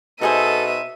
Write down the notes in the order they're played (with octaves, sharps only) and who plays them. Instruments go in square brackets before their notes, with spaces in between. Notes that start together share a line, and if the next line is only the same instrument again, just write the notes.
[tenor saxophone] B2 [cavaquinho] D#4 G#4 C5 [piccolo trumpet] A4 [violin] E5 D#7